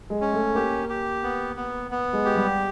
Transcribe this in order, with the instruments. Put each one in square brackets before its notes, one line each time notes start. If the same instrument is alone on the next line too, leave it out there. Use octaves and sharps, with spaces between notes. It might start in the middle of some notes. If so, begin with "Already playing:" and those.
[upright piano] G#3
[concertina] C#4
[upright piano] A3
[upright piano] A#3 [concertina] G4
[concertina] G4
B3
B3
B3
[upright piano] G#3
[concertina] G4
[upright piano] G3